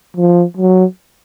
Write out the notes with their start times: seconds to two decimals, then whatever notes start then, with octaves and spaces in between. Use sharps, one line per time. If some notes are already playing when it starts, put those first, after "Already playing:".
0.17 F3
0.57 F#3